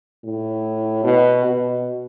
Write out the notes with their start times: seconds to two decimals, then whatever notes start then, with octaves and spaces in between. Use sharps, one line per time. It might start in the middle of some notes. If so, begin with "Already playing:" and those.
0.24 A2
1.04 B2
1.45 B2